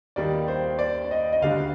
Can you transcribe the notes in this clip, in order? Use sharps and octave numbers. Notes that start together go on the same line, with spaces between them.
D#2 D#3 G3 D5
C5
D5
D#5
D#5
D2 D3 G3 F5